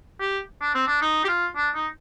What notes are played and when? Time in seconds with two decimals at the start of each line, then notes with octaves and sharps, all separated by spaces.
0.20 G4
0.61 D4
0.74 C4
0.87 D4
1.01 D#4
1.24 G4
1.28 F4
1.56 D4
1.74 D#4